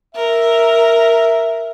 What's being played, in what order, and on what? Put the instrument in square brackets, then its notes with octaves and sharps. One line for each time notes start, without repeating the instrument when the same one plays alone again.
[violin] A#4 [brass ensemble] E5